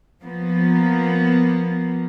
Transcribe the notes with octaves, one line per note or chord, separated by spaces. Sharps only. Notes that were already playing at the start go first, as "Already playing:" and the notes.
F3 A#3 B3